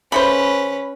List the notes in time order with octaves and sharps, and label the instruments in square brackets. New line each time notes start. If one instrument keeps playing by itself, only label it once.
[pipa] C#3 A3 C5 [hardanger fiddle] C#4 B4 [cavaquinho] B5